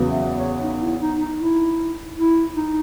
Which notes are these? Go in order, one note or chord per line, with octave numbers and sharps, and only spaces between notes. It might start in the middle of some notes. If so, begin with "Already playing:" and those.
Already playing: E2 C#3 F#3 B3
E5
C#5
D#4
E4
D#4
D#4
E4
E4
D#4